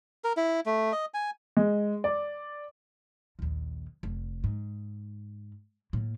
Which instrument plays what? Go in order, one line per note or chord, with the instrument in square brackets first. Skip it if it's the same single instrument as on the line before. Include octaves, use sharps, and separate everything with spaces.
[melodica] A#4
E4
A3
D#5
G#5
[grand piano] G#3
D5
[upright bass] A#1 D#2
F1
G#2
A2 A#3